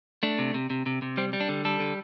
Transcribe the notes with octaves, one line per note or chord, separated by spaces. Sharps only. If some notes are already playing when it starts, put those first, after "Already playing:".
A3 D4
C3
C3
C3
C3
C3
G3 C4
G3
D4
D3
G3 A4
D3